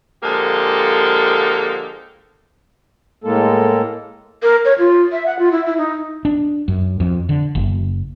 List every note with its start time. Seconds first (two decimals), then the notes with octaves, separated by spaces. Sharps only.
0.24 D3 F3 G#3 A#3 G4 A4
3.24 A2 G#3 A#3 A4
4.43 A#4
4.65 C#5
4.79 F4
5.12 E5
5.26 F#5
5.39 F4
5.52 E4
5.66 E4
5.78 D#4
6.25 D4
6.68 F#2
7.00 F2
7.29 D3
7.55 F#1